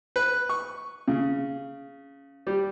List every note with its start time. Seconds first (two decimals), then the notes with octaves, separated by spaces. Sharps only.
0.16 B4
0.49 C#6
1.08 C#3
2.47 G3